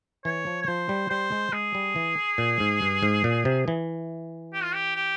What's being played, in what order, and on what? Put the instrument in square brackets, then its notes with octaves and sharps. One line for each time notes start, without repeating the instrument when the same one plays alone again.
[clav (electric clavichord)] E3 [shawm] C#5
[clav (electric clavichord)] F3
[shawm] C#5
[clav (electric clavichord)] F3 [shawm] C5
[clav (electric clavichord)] G3
[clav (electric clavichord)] G3 [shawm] C5
[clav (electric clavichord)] G#3
[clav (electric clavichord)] G#3 [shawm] G#4
[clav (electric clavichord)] G3
E3
A#2
G#2
G2
G#2
A#2
C3
E3
[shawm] G4
F4
G4
G4